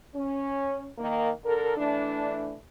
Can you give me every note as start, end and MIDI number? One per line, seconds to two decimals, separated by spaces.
0.15 0.88 61
0.98 1.30 51
0.98 1.30 58
1.44 1.75 50
1.44 1.75 69
1.44 1.75 70
1.77 2.56 52
1.77 2.56 57
1.77 2.56 62